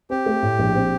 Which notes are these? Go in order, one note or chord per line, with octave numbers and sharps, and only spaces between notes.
C4 G4
A3
A2
A#1
C4